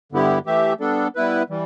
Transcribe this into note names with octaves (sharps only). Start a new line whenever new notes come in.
G2 D3 B3 E4 G4
E3 A3 G4 E5
G3 B3 D4 A4
G3 B3 E4 B4
E3 G3